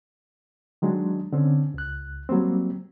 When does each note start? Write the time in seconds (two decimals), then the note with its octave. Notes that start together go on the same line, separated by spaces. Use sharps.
0.82 D#3 F#3 G#3 D4
1.33 D3 C4 C#4
1.74 C#2 F#6
2.29 F#3 G3 A#3 C4